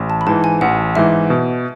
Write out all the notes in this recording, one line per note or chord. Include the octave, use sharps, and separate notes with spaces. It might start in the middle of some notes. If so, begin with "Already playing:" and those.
Already playing: A1
A5
B5
G#2 E3 A5
G#5
A1 F#5
G#2 E3 E5
B2